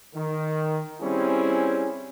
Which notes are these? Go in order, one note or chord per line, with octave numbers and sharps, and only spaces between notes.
D#3
G3 C4 C#4 E4 G#4